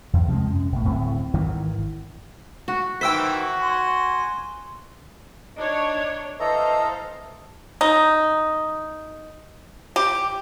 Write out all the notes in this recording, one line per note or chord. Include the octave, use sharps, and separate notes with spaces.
E2
C3 F3 G3 G#3
F#2
B1 A2
D1 A2 A3 C4
G#1 D#3 E3
F#4
D#3 E3 E4 F#4 C5 G5 E6 B6
G#5 C6
D4 D#4 C#5
E3 A4 C5 D#5 F5 A#5
D#4
G4